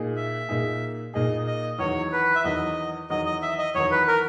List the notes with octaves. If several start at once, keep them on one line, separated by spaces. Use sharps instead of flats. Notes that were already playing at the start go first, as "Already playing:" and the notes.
Already playing: A#2 A#3 D#4 G#4
E5
A#2 A#3 D#4 G#4
A#2 A#3 D#4 G#4 D#5
D#5
E2 D#3 F#3 C#5
B4
E5
E2 D#3 F#3 D#5
E2 D#3 F#3 D#5
D#5
E5
D#5
E2 D#3 F#3 C#5
B4
A#4